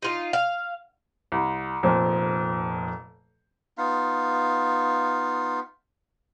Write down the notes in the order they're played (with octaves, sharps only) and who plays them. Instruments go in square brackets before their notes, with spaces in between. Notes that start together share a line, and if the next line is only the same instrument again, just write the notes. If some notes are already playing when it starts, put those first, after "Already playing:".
[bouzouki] D#4 F4
F5
[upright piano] C2
F1 F2 A#2 C5
[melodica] B3 D#4 F4 F5